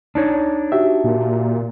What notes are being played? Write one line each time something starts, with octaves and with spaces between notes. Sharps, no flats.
D4 D#4 C#5
F#4 G4 E5
A#2